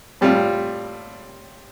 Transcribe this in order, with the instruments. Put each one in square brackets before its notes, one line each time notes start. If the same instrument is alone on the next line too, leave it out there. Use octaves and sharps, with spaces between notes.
[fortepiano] A2 G3 C4 F4